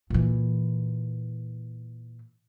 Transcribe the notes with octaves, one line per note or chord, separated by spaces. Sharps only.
A#2 E3